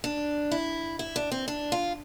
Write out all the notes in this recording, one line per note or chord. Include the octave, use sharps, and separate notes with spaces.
D4
E4
E4
D4
C4
D4
F4